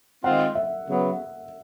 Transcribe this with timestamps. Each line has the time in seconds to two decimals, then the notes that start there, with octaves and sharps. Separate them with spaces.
0.24 D#3 G#3 C4 F4 F#5
0.55 E5
0.88 C#3 F#3 B3